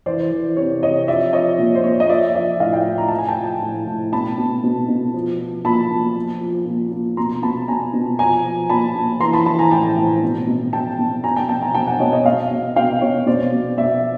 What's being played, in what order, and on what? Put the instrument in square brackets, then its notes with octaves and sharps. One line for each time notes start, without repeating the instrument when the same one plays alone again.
[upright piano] E3 C5 D5
E3
C3 C#5
C3 C#5 D#5
F3 D5 E5
F3 C#5 D#5
A#2
C5
A#2 C#5
D5
D#5
F3 D5 E5
F3 D5 E5
A2 D#5 F5
F5 G5
A2
A#5
F3 A5
G#5
G5 A5
F3
A2
A2
B2 A5 B5
B2
B2
B2
F3
F3
A#2 A5 B5
A#2
F3
F3
A#2
A#2
B2 A#5 C6
B2 A5 B5
B2 G#5 A#5
B2
F3 G#5 A#5
F3
A#2 A5 B5
A#2
E3 A#5 C6
A5 B5
E3 A5 B5
G#5 A#5
A2 G5 A5
A2
B2
B2
B2 G5 A5
B2
B2 G#5 A#5
G5 A5
B2 G5 A5
G#5 A#5
B2 G5 A5
F#5 G#5
B2 C#5 D#5
C#5 D#5
B2 D#5 F5
B2
B2 F5 G5
B2 C#5
B2 C5 D5
B2
B2 D5 E5